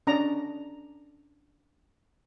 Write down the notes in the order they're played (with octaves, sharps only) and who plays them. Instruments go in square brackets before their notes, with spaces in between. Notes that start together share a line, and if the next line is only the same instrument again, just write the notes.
[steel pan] C#4 D4 D5 A#5